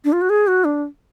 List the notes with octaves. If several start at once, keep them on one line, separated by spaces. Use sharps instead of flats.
D4
F4
F#4
G#4
F#4
D4